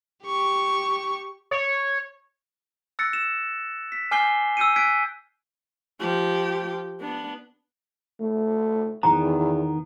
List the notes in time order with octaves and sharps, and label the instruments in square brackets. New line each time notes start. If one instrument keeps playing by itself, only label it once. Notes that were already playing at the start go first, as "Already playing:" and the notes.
[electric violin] G4 C#6
[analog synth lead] C#5
[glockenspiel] E6 F#6 A6 A#6 C#7 D7
E7
B6
G#5 D6 F6 G6 C7 G7
E6 F6 G6 C#7 D#7
F6 F#6 G#6 B6 D7
[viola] F3 G4
B3 D4
[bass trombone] A3
[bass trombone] E2 [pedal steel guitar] D#3 B3 [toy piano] A#5